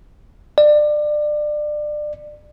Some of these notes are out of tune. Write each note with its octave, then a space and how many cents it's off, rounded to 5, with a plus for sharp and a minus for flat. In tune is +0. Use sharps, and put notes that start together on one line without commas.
D5 +25